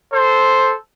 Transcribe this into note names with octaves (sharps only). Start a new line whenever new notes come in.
A4 C5